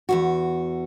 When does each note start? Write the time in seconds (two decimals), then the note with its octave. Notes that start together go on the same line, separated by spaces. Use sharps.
0.09 E2 G2 F#4